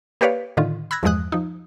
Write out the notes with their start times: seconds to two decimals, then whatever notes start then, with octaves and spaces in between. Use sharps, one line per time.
0.21 A#3 G4 B4 C#5 D5 F5
0.57 A2 D3 D#3 F4
0.91 B5 E6 F#6 G#6 A#6
1.03 E2 G2 F3 G#3 D#6 F#6
1.32 F3 D#4